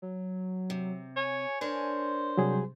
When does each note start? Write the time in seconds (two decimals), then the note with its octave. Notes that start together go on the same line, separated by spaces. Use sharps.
0.02 F#3
0.70 C3
1.16 C#5 G#5
1.61 D4 A#4 C5 C#5
2.37 C3 F#3 G3 G#4